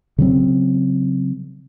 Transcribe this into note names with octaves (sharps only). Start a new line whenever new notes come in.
C#3 F#3 C4